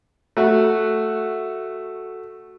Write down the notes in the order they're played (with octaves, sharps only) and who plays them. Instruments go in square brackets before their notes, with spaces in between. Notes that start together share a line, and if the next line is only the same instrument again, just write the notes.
[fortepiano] A3 F#4